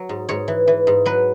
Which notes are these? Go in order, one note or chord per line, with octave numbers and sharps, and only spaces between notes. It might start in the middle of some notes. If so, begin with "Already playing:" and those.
Already playing: F#3
G#2
G#2 C#5
E3
E3
G#2
F#3 B4